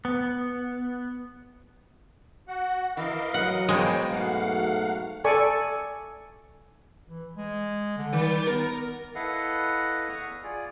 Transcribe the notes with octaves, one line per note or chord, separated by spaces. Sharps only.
B3
F#4 F#5
E3 A#4 D#5 F5
F#3 F#5
B2 G#3 A#3 C5 C#5 G5
G#2 F#3 A3 F5 F#5
A4 D5 G#5 C#6
E3
G#3
D3
D#3 G3
B3 A#4
E4 A4 B4 D#5 F5 F#5
E2 C#6 D#6 F6
F4 G#4 D5